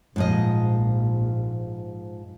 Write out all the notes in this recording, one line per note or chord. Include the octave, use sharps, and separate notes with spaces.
A#1 G#2 F3 D#5